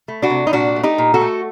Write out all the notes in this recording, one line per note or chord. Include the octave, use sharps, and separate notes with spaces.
A3
D4 F#4
C3
D#4
A#2 D4 F#4
A3
D#4 G4
A#2
F#4 A4
A3